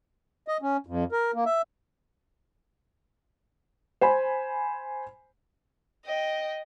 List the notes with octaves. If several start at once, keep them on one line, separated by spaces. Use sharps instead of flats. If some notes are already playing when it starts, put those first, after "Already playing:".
D#5
C#4
F2
A#4
A#3
E5
C5 G#5 B5
D#5 G5